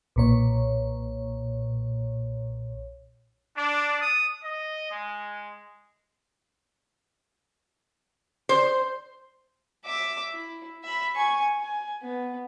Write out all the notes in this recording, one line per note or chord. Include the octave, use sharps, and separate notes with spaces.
B1 A#2 C#5
D4
D#6
D#5
G#3
C5
E5 D6
E4
E5 B5
G#5 C#6
G#5
B3